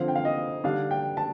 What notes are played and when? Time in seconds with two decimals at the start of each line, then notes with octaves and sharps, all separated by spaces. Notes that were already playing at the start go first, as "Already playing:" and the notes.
Already playing: D3 F3 C4 F5
0.08 G5
0.16 F5
0.25 D#5
0.64 D3 G3 D4 F5
0.91 G5
1.17 A5